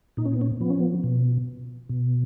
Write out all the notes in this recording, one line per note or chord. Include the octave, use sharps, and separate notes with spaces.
A#2 D#4
C#4
B3
C#4
F3 B3
C#4
B3
B2
B2